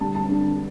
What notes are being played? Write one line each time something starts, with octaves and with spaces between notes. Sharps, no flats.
D3 G3 D4 A5
A5
D3 G3 D4